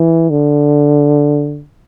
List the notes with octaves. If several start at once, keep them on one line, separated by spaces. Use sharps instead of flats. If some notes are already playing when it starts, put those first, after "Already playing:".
Already playing: E3
D3